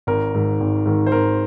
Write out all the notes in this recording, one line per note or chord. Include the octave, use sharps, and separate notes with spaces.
G#1 A#4
G#2 D#3
G#1
G#2 D#3
C5
G#1 A#4